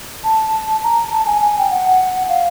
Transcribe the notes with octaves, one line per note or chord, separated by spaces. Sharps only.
A5
A#5
A5
G#5
G#5
G5
F#5
F5